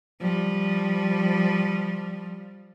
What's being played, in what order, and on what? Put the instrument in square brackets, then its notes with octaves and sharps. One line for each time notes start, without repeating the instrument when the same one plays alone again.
[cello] F3 G3